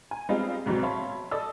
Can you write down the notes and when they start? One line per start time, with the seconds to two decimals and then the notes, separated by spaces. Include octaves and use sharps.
0.11 G#5
0.29 G3 G#3 B3 C4 D#4 F4
0.66 D2 G#2 B2 F#3 C4
0.83 C#5 E5 F5 A5 B5 C6
1.31 A4 D5 D#5 A5 D#6 E6